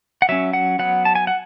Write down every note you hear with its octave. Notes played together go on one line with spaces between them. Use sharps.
F#5
F#3 C#4 E5
F#5
F#3 B3 F#5
A5
G#5
F#5